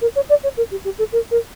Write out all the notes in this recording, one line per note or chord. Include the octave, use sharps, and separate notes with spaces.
A#4
C#5
D5
C#5
A#4
G4
G4
A4
A#4
A#4